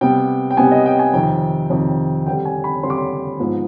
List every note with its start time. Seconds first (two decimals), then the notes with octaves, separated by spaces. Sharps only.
0.01 C3 G3 B3 G5
0.51 G5
0.57 C3 G3 B3 G#5
0.71 D#5
0.86 G5
0.99 G#5
1.14 F2 C3 D#3 G5
1.70 F2 C3 D#3
2.26 D3 G3 C4 G5
2.45 G#5
2.64 B5
2.83 D3 G3 C4 C6
2.90 D6
2.97 C6
3.39 G#2 F3 B3